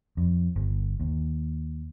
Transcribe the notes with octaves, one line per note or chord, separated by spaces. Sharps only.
F2
G1
D#2